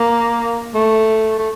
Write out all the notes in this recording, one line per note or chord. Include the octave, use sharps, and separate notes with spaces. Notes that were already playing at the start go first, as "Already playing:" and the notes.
Already playing: A#3
A3
A3